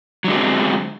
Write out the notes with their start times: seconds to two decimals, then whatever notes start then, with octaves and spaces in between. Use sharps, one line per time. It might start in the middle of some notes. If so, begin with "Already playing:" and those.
0.24 F#3
0.27 D3
0.30 G#3
0.32 B3
0.35 C4